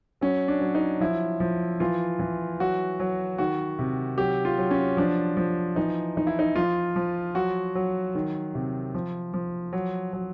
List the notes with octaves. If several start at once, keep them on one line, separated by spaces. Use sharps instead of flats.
F#3 C#4
D4
F#3
D#4
F3 E4
F3
E3 F4
E3
F#3 F#4
F#3
D#3 F#4
C3
F#3 G4
F4
F#3
C#4
F3 D4
F3
E3 D#4
E3 D#4
E4
D#4
F3 F4
F3
F#3 F#4
F#3
D#3
C3
F3
F3
F#3
F#3